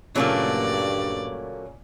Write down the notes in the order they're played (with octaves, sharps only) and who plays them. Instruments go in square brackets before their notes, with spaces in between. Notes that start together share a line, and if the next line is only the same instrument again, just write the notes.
[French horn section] G2 [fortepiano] A#2 C#3 C#4 [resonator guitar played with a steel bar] F#3 A3 A#3 [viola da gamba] D5